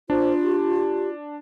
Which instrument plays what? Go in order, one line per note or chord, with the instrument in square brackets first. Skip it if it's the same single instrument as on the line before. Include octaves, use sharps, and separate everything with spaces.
[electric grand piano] D4 [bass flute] F4 [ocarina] C5
[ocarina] G4